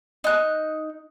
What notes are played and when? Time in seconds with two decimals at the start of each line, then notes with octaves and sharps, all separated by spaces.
0.24 D#4 F#6